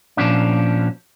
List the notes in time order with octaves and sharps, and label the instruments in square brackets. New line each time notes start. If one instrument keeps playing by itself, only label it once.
[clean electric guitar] A#2 F3 C#4 D4